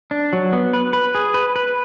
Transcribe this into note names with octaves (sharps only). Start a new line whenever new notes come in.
D4
F#3
B3
B4
B4
G#4
B4
B4